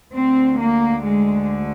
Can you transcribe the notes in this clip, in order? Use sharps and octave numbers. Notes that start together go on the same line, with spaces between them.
D2 D3 C4
A#3
G#3